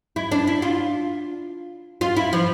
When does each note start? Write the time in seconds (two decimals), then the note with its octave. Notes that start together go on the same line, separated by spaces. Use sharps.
0.16 E4
0.32 D4
0.47 E4
0.62 F4
2.01 F4
2.17 E4
2.33 F3